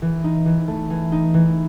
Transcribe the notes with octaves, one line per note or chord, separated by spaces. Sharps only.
E3
D#4
E3
A3
E3
D#4
E3